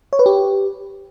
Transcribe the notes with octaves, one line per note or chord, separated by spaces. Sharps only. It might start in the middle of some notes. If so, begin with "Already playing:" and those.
C#5
B4
G4